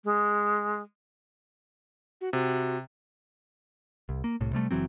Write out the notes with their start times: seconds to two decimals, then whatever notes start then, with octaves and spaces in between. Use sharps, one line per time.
0.05 G#3
2.21 F#4
2.33 C3 F#4
4.09 C2
4.24 A#3
4.41 C2 A2
4.53 C3 G3 A3
4.71 F#1 E3 F#3 C4